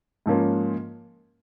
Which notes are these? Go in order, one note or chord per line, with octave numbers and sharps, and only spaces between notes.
G#2 F3 A#3 C#4